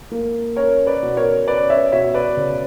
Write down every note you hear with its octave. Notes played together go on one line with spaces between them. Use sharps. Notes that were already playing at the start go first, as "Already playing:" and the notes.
A#3
C#4 A#4 C#5
B4 D5
B2
A#4 C#5
C#4 B4 D5
C#5 E5
B2 C#5 E5
B4 D5
C#3